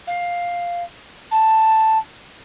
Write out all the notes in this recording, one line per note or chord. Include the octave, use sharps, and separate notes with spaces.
F5
A5